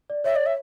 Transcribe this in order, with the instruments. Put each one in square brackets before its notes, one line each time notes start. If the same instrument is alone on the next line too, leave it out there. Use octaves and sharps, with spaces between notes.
[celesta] D5
[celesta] C#5 [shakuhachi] E5
[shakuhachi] D5
E5